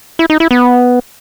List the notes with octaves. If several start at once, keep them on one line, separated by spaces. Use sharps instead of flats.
E4
D#4
E4
B3